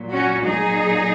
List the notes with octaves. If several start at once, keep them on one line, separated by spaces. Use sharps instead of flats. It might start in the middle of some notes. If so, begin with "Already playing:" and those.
Already playing: A#2 F#3
C#4 F#4
D#4 G#4